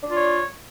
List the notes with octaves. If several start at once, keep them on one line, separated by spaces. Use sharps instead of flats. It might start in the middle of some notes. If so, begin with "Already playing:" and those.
D4 F4 C#5 D5